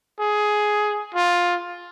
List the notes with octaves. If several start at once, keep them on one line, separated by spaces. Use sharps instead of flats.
G#4
F4